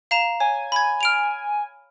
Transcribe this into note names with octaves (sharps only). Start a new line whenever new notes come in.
F5 A#5 E7
C#5 G#5
B5 G#6
F6 D7 F7